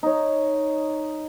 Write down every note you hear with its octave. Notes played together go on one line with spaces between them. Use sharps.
D#4 C#5